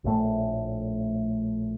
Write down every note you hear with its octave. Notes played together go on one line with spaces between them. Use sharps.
A#1 A2 A3